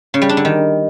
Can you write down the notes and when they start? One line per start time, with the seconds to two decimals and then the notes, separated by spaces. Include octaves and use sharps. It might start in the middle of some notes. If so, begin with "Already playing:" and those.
0.14 C#3
0.22 G3
0.29 D4
0.37 D3
0.45 D#3